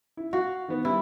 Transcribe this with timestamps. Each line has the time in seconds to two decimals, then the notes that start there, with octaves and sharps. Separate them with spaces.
0.17 E4
0.33 F#4 F5
0.68 D#3 B3
0.85 G3 E4